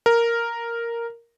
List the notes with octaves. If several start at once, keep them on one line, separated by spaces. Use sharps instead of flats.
A#4